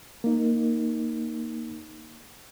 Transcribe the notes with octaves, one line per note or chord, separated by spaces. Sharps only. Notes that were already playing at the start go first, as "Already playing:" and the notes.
A#3 D#4